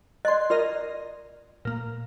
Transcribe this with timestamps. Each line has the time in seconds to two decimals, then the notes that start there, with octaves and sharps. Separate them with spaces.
0.25 D5 D#5 C6 F#6
0.50 F4 A#4 D5 D#5
1.65 A#2 A#3